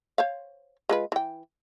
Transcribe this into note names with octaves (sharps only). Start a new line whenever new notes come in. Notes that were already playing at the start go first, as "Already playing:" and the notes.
C5 C#5 F5
G#3 F4 B4
E3 G5